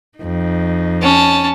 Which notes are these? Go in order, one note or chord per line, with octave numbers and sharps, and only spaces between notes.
F2 D#4
C#4 A5